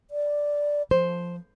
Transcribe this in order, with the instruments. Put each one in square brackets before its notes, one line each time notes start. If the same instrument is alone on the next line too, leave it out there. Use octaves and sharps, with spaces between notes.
[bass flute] D5
[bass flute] F3 [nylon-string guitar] C5